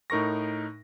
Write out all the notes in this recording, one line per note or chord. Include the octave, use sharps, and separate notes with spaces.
A2 D#4 A#4 C#6 A#6